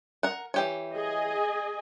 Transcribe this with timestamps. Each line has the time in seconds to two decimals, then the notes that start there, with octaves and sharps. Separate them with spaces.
0.23 A#4 F#5
0.54 E3 G4 C#5
0.95 G#4 D#5 G#5